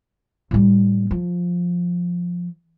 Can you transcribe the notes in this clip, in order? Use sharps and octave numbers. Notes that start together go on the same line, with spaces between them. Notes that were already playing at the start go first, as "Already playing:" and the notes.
A2 G3
F3